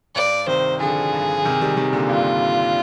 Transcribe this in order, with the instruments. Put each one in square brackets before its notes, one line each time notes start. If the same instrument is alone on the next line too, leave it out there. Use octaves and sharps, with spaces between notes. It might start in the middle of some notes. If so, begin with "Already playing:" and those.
[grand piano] G2 [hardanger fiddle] D5
[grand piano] C3 D#3 [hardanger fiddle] C5
[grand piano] D3 F3 [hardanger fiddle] G#4
[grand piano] G2
C3 D#3
D#3 G3
C3 D#3
A#2 D3
[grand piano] G2 A#2 [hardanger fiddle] F4